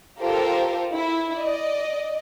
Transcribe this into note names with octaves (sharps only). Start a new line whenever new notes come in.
F4 G4 A4 A#4 C5
E4
D5 D#5